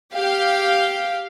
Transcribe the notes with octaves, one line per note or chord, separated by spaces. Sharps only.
G4 F5